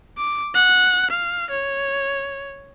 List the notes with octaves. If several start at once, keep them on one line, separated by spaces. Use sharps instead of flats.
D6
F#5
F5
C#5